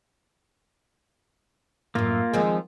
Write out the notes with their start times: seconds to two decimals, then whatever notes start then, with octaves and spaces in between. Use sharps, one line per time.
1.95 F#2 A2 A#3 F4
2.33 D#3 F3 G#3 C4